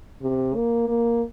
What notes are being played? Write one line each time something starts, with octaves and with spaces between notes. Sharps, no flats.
C3
A#3
A#3